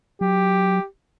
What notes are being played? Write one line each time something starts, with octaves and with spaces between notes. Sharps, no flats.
F#3 G4